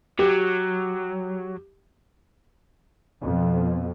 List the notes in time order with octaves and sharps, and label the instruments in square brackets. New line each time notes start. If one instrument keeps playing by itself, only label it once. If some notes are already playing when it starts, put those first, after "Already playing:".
[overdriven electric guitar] F#3 [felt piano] G4
[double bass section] F2 B2